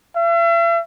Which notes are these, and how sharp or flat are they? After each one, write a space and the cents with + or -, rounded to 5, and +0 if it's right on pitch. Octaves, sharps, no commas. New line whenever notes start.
E5 +45